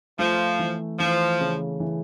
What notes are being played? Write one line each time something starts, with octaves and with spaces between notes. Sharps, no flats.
F3 A3
E3
E3 F3
C#3
E3